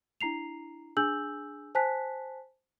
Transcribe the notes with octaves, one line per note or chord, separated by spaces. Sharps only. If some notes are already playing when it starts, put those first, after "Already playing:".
D4 E4 A#5 C7 F7
D4 G#4 G#5 E6 G6 F#7
C5 G#5 A5 F#6 B6